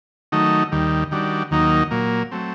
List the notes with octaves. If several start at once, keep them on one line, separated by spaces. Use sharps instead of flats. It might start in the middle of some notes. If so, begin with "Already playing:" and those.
D#3 F#3 A3 D#4
D#2 D#3 G3
D#3 G3 D4 F#4
D#2 D#3 F#3 A#3 D#4
A#2 F#3 A#3
F#3 A3 C4